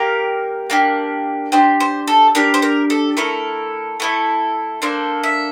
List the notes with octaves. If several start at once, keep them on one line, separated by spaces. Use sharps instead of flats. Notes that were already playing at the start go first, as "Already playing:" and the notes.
Already playing: A#3 G4 A#4
A#3 D4 G4
D4 G4 C5
C5
A4
D4 G4 A#4
C5
A#4
A4
A3 E4 A4 A#4
A3 E4 A4
A#3 D4 A4 C5
E5